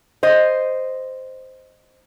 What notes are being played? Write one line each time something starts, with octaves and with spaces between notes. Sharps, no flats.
C5 D#5